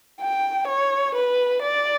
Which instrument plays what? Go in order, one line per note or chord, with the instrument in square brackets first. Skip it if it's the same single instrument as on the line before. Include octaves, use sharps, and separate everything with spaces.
[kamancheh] G5
C#5
B4
D5